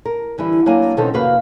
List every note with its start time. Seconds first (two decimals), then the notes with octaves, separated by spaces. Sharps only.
0.05 A#4
0.38 D3 E3 G3 E4
0.66 F#3 A#3 D4 G#5
0.97 B2 D3 D#3 C4 C#4 A4
1.14 F2 C3 A#3 F#4 B4 F5